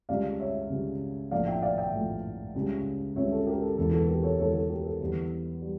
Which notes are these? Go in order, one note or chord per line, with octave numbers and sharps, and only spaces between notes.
C#2 C#3 G3 D5 F5
C#5 E5
C#2 C#3 G3
A#1 A2 F3 A3 D5 F5
E5 G5
D5 F5
E5 G5
A#1 A2 F3 A3
C#2 C#3 G3 C#4
C#2 C#3 G3 C#4 C#5 E5
A4 C#5
G4 A#4
A4
E1 E2 E3 A4
A4
G4 A#4
A4 C#5
E1 E2 E3 A4 C#5
A4
G4 A#4
A4
E2 E3 G3
G3